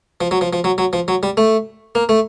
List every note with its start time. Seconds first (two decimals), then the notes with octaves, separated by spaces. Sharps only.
0.21 F3
0.31 F#3
0.41 F3
0.53 F3
0.64 F#3
0.78 F#3
0.93 F3
1.08 F#3
1.23 G3
1.37 A3
1.95 A#3
2.09 A3